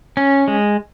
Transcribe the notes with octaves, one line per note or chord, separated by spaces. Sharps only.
C#4
G#3